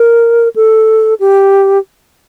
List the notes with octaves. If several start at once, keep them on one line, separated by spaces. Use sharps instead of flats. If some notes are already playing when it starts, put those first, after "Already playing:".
Already playing: A#4
A4
G4